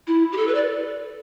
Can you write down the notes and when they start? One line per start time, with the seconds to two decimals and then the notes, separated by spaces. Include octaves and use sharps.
0.07 E4
0.32 G4
0.37 A4
0.48 B4
0.54 D5